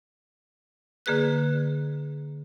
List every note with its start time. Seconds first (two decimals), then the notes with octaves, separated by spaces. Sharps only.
1.06 D3 A#3 G#4 B4 F#6